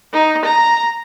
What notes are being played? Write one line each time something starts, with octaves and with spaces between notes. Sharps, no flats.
D#4
A#5